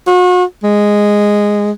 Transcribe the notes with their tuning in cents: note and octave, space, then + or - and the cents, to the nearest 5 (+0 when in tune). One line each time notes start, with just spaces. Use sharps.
F#4 -40
G#3 -5